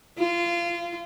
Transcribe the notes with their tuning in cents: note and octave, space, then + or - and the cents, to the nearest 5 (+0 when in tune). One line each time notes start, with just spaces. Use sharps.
F4 -25